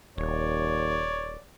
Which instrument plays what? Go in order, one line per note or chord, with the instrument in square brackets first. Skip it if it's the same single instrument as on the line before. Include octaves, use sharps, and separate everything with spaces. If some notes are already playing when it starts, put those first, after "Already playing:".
[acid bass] D#1 [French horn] D#2 [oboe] C#5 [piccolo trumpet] D5